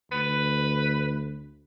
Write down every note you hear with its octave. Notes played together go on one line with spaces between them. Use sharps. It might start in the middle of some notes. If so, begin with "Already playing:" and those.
D2 B4